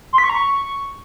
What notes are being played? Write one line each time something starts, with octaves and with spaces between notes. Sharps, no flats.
C6
B6
C#6
A#5
C#6